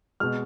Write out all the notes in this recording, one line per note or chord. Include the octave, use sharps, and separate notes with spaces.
B2 G#3 F6